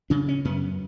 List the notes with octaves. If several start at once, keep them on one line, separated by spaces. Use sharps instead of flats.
C#3 D4
C#4
F#2 B3